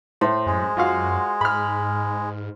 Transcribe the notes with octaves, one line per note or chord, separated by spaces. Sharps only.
A2 C5
F#2 G#3
F#2 F4 F#4 F5
G#2 B5 F6